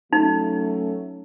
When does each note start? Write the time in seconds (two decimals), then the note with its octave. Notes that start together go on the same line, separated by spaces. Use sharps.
0.13 F#3 A3 C#4 D#4